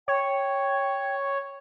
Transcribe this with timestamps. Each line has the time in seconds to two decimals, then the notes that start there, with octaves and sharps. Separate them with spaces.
0.08 C#5 G5